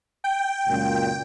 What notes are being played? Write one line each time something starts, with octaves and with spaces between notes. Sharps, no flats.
G5
C#2 F#2 A#2